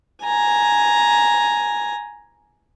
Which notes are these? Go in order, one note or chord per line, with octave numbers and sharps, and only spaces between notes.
G#5 A#5